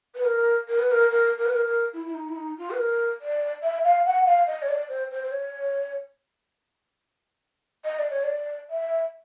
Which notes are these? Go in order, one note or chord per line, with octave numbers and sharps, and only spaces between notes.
B4
A#4
A#4
B4
A#4
A#4
A#4
B4
A#4
A#4
E4
E4
D#4
E4
D#4
F4
B4
A#4
D5
E5
F5
F#5
F5
D#5
C#5
D5
C5
C5
C5
C#5
D#5
D5
C#5
D5
E5